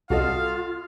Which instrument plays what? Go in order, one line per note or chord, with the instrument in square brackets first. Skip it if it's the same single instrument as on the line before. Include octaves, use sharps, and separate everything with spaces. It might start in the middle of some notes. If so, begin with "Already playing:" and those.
[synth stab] C2 [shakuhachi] F4 [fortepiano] F#4 A4 D#5 [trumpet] F5